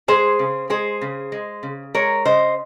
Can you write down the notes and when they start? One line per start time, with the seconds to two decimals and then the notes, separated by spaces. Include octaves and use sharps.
0.08 G#3 G#4 C5
0.39 C#3
0.70 G#3 G#4 C5
1.01 C#3
1.32 G#3
1.63 C#3
1.95 G#3 A#4 C#5
2.25 C#3 C5 D#5